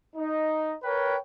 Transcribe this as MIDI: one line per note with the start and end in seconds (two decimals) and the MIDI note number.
0.16 0.74 63
0.83 1.17 70
0.83 1.17 71
0.83 1.17 73
0.83 1.17 79